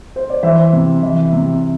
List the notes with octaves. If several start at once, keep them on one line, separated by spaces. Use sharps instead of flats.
C5
D5
E3 C5 E5
C3
E3
C3